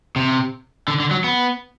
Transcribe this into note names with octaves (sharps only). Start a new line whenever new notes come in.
C3
D3
D3
F#3
B3